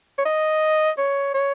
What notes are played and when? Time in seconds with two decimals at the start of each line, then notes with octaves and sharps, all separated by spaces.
0.18 C#5
0.25 D#5
0.98 C#5
1.34 C#5